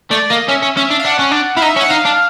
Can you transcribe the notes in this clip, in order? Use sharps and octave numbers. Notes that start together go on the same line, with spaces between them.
A3 D5
A#3 D#5
C#4 E5
C#4
C#4 E5
D4
F5
D4 F#5
C#4
D4
E4 F5
D#4 E5
C#4
F#5
D#4 F5
D4